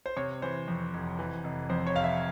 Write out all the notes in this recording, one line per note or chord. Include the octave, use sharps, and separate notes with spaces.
C5
C3 C#5
E3 C5
F2
F1
E3
F1
F2 C5
C#5
F1 F5
E5